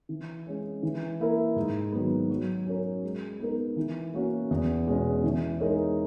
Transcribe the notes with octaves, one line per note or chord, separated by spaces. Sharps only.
E3
G#3 C#4
E3
A#3 E4 A#4
G#2
D#3 F#3 B3
F#3
C#4 F#4 A#4 C#5
G#3
B3 D#4 A#4
E3
A#3 C#4 F#4
E2
B2 G#3 C#4
E3
G#3 D#4 A#4 C#5